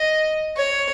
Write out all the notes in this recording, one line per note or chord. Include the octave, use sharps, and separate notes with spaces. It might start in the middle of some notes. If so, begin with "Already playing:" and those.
Already playing: D#5
C#5